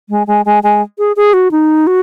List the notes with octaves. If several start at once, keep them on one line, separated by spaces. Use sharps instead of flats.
G#3
G#3
G#3
G#3
G#4
G#4
F#4
D#4
F#4